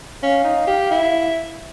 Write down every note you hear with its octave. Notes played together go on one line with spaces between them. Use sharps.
C#4 F5
D#4
G4
E4